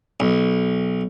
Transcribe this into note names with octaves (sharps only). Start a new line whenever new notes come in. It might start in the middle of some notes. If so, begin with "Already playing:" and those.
B1